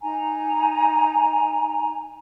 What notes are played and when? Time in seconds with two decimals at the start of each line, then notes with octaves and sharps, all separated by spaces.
0.01 D#4 G#5 A#5